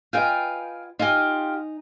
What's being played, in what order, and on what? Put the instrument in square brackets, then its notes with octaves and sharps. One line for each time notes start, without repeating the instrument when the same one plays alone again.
[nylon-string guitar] F4 B4 D#5 [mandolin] F5 G5 G#5
[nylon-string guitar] D#4 G#5 [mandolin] F4 G4